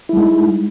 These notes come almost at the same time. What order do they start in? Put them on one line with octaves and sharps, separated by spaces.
E4 G3 G#3 D#4